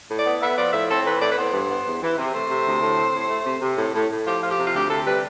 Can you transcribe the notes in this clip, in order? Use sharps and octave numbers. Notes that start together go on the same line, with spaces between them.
A2
D5
B3
B3 E5
F3 D5
A2 E5
C4 A4
E3 B4
A2 D5
B4
B3 C5
G2
B3
E2
E3
C3
A3 C5
C3
D2
A2
C4
A2
A3
C3
C3
A2
A2
A2
F3 G4
F3 F4
G4
C3
F4
D2 G4
C3 A4
G3 B4